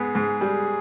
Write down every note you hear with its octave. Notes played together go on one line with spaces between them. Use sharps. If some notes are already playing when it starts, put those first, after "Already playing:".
Already playing: G#2 B3 G#4
G#2
G3